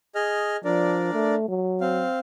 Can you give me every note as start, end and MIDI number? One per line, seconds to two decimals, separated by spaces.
0.15 0.57 68
0.15 0.57 75
0.15 0.57 89
0.64 1.13 53
0.64 1.35 62
0.64 1.35 70
0.64 1.35 74
1.14 1.44 57
1.48 2.06 54
1.81 2.19 60
1.81 2.19 77